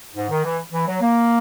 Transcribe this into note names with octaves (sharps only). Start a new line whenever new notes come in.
G#2
D#3
E3
E3
F#3
A#3